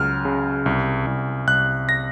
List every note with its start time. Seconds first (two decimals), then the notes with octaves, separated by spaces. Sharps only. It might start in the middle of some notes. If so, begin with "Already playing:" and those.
Already playing: C#2 C#3 F#3 F6
0.25 C#3
0.66 C2
1.07 C2
1.47 C2 F#6
1.89 A#6